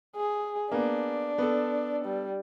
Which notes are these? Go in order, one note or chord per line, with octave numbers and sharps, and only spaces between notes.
G#4
A#3 B3 D4
B3 A4
G3